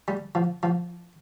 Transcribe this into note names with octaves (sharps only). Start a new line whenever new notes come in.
G3
F3
F3